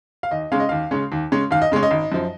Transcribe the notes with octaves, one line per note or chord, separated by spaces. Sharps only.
F5
D#2 D#5
C#3 G#3 C#4 F5
D#5
D#2 F5
C#3 G#3 C#4
D#2
C#3 G#3 C#4
D#2 F5
D#5
C#3 G#3 C#4
D#5
G#1
F#2 F3